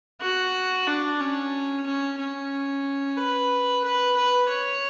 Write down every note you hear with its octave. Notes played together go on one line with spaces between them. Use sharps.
F#4
D4
C#4
C#4
C#4
B4
B4
B4
C#5